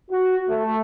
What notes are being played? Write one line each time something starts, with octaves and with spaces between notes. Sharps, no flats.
F#4
A3